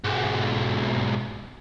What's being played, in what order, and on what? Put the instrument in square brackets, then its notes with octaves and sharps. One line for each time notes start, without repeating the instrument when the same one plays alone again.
[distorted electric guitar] B1 G#2